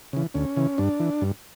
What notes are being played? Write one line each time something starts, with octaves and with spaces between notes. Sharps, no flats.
C#3 E3
D2 C#4
C#3 E3
G2 D4
E3
G2